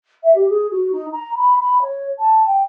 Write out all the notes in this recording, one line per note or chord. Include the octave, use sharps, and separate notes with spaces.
E5
G4
G#4
F#4
D#4
A#5
B5
B5
C#5
A5
G5